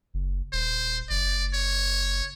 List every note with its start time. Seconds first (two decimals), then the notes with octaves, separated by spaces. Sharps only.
0.14 F#1
0.53 D#1 C5
1.10 F#1 D5
1.54 C#5